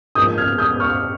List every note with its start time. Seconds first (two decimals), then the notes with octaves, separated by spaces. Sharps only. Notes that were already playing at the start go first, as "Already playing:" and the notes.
0.15 G#2 F3 A#3 C#4 D#6 G6
0.38 F6 G#6
0.58 D#6 G6
0.80 C#6 F6